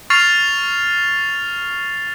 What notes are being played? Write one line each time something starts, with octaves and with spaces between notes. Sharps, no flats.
C#6 F6 A6 C7 F7